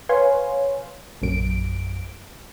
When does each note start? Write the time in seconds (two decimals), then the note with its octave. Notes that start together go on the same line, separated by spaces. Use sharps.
0.09 B4 C#5 F5 G#5 C6
1.22 A#1 F#2 D7